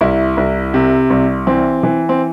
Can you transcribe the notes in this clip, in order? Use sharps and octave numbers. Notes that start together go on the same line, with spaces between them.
C2 E4
C2
C3
C2
E3 C4
E3
C4